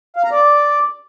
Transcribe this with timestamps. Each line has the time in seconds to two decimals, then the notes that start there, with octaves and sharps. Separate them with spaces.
0.16 F5
0.24 A#5
0.32 D5